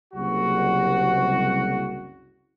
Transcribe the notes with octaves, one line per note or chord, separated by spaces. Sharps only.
F#1 C2 F#4